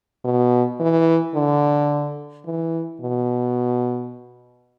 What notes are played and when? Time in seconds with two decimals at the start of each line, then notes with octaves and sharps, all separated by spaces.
0.24 B2
0.80 E3
1.35 D3
2.46 E3
3.01 B2